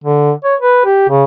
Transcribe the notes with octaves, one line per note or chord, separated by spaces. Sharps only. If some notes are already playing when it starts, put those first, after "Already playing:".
D3
C#5
B4
G4
C#3